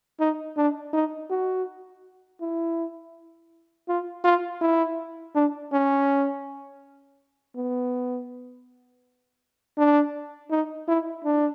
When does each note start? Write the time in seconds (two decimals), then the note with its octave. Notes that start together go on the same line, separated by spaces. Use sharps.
0.20 D#4
0.57 D4
0.93 D#4
1.30 F#4
2.41 E4
3.88 F4
4.24 F4
4.61 E4
5.35 D4
5.72 C#4
7.56 B3
9.78 D4
10.51 D#4
10.88 E4
11.24 D4